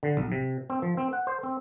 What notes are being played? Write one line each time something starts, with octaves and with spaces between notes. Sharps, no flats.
D3
B1
C3
C4
F3
C4
F#5
C5
C4